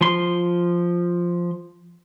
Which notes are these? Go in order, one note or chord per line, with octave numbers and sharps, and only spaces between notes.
F3 C6